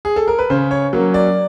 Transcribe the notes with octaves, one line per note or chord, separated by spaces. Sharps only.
G#4
A4
A#4
B4
C#3 C5
C#5
F#3 A#3 C#4
D5